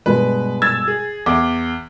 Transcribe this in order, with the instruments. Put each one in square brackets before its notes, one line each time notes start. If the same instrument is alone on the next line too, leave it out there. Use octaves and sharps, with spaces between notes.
[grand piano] G2 B2 G#3 [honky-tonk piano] B4
[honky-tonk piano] E6 G#6 A6
G#4
[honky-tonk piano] E2 [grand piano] D6